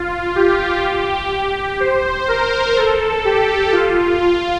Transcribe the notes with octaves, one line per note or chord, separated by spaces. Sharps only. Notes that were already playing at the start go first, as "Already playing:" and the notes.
Already playing: F4
G4
C5
A#4
A4
G4
F4
F4